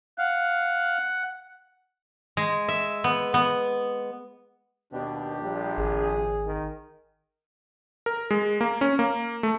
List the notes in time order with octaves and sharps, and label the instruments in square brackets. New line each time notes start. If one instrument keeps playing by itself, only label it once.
[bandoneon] F5 [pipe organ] F#5
[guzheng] G#3
E5
B3
B3
[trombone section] D#2 B2 [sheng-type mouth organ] D4 G4
[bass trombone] A#1 [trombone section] G3
[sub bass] G#1 [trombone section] G#4
[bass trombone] D#3
[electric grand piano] A#4
G#3
A#3
C#4
A#3
A3